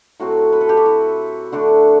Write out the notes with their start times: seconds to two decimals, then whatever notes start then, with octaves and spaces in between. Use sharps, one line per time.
0.20 A2 F#3 C4 F#4
0.52 B4
0.61 A4
0.69 G4
0.77 F#4
0.86 E4
1.52 D3 A3 D4 F#4